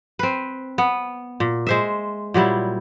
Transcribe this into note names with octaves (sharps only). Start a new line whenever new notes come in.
C4 B4
B3
A#2
G#3 C5 E5
A#2 F#3 G3 E4